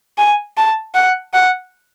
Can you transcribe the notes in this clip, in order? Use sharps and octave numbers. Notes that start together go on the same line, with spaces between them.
G#5
A5
F#5
F#5